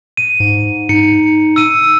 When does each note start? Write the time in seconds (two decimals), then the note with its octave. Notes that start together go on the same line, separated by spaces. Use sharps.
0.17 D#7
0.40 G#2
0.89 D#4 C#7
1.56 E6 D#7